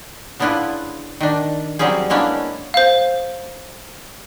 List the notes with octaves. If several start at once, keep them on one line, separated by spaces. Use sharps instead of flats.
C#3 B3 D4 E4 F4 B4
D#3 D4
F#3 G3 C4 C#4 G#4
G#3 A#3 B3 C#4 D4 E4
C5 F5